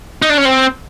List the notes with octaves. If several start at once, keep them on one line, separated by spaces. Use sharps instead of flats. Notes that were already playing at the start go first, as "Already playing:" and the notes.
D#4
D4
C#4
C4